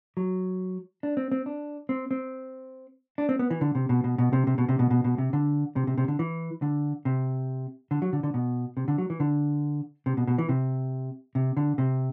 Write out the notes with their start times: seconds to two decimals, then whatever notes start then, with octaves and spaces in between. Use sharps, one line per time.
0.17 F#3
1.03 D4
1.17 C4
1.32 C4
1.46 D4
1.89 C4
2.11 C4
3.18 D4
3.29 C4
3.39 B3
3.50 E3
3.61 D3
3.75 C3
3.89 B2
4.04 B2
4.18 B2
4.33 C3
4.47 C3
4.58 B2
4.69 C3
4.79 B2
4.91 B2
5.04 B2
5.18 C3
5.33 D3
5.76 C3
5.87 C3
5.98 C3
6.08 D3
6.19 E3
6.62 D3
7.05 C3
7.91 D3
8.02 F#3
8.13 D3
8.23 D3
8.34 B2
8.77 C3
8.88 D3
8.98 F#3
9.10 E3
9.20 D3
10.06 C3
10.17 B2
10.28 B2
10.38 E3
10.49 C3
11.35 C3
11.57 D3
11.78 C3